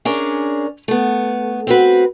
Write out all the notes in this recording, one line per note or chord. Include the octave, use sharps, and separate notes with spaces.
C#4 D4 G#4 A#4 D5
A3 B3
C4 F#4 B4